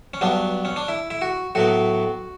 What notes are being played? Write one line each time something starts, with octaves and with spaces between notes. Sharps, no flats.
C#4
G2 F#3 B3 D4
C#4
D4
E4
E4
F#4
A2 F#3 B3 F#4